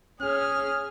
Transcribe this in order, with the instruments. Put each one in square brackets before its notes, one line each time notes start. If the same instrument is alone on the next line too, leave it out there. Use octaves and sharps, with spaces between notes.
[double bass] C#4 [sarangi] G#4 [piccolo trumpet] F6